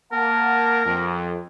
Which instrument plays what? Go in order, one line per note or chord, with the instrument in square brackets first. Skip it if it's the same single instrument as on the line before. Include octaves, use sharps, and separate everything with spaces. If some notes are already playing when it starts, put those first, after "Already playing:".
[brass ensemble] A#3 F#5 A5 [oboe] A#4
[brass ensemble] F2